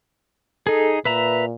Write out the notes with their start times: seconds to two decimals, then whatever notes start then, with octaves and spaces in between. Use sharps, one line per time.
0.67 D#4 G#4 A4
1.05 A#2 B4 E5 A#5